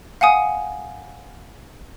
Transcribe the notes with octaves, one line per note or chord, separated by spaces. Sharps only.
F5 F#5 G#5 D#6